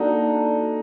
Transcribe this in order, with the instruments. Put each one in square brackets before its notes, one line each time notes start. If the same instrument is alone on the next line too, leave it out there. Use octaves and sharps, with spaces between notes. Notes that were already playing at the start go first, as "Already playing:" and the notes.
Already playing: [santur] A#3 D4 F#4 A4 [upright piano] D#4